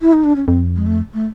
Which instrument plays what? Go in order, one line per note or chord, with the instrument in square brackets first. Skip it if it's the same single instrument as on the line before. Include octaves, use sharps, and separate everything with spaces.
[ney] E4
D#4
D4
C#4
[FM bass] F2 [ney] C4
[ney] G#3
A3
A3